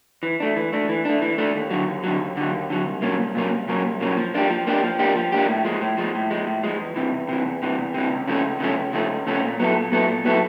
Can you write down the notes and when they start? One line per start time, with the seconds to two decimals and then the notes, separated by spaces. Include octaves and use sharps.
0.23 E3
0.40 A3 D4
0.56 E3
0.72 A3 D4
0.89 E3
1.05 A3 D4
1.22 E3
1.38 A3 D4
1.55 D#2
1.70 D3 F#3
1.88 D#2
2.04 D3 F#3
2.20 D#2
2.37 D3 F#3
2.53 D#2
2.70 D3 F#3
2.87 C2
3.02 A#2 F#3 A#3 C#4
3.18 C2
3.35 A#2 F#3 A#3 C#4
3.51 C2
3.68 A#2 F#3 A#3 C#4
3.85 C2
4.00 A#2 F#3 A#3 C#4
4.17 F3
4.34 A#3 D4 G4
4.50 F3
4.67 A#3 D4 G4
4.83 F3
4.99 A#3 D4 G4
5.16 F3
5.32 A#3 D4 G4
5.48 A2
5.64 F3 G#3
5.81 A2
5.98 F3 G#3
6.15 A2
6.30 F3 G#3
6.47 A2
6.63 F3 G#3
6.79 E2
6.96 C3 E3
7.12 E2
7.29 C3 E3
7.46 E2
7.63 C3 E3
7.78 E2
7.94 C3 E3
8.11 C#2
8.27 C#3 F3 A3 C#4
8.44 C#2
8.60 C#3 F3 A3 C#4
8.77 C#2
8.93 C#3 F3 A3 C#4
9.10 C#2
9.27 C#3 F3 A3 C#4
9.42 A#2
9.59 F#3 B3 E4 A4
9.75 A#2
9.92 F#3 B3 E4 A4
10.08 A#2
10.25 F#3 B3 E4 A4